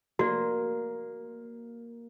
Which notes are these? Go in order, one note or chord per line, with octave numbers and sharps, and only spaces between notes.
A#3 F#4 D5